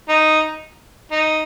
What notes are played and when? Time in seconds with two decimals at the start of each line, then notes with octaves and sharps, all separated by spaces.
0.09 D#4
1.11 D#4